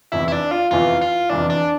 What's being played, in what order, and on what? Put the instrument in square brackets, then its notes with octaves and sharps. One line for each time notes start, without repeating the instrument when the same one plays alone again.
[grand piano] F1 E2 E3 [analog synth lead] E4
[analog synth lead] E4
D4
F4
[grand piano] F1 E2 E3 [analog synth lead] F4
[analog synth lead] F4
[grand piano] F1 E2 E3 [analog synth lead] D4
[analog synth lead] D4